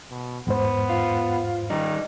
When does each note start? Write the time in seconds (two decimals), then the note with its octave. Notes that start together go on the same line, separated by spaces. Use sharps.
0.10 B2
0.47 E2 G#2 B3 C5
0.89 F4
1.70 D#3 G3 D#4